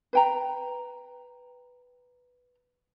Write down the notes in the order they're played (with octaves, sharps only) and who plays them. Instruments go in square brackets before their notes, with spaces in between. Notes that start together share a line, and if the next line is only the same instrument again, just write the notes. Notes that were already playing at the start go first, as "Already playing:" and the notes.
[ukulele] B4 G5 A#5